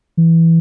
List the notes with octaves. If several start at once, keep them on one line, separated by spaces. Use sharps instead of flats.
E3